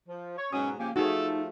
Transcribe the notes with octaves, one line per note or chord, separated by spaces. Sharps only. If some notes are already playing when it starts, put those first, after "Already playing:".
F3
C#5
G#2 B2 F#3 C#4 D#6
C#3 F3 A#3 G4 G#5
F3 A3 D#4 F#4 G#4 A4